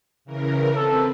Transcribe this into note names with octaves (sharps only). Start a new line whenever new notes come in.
C#3 E3 A#4
C4 A4 B4